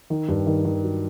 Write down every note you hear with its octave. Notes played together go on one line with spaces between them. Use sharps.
D#3
G2
D#3
D#3
F#3